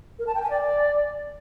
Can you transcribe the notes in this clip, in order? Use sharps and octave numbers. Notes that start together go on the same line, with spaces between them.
A#4
A5
G5
G#5
D5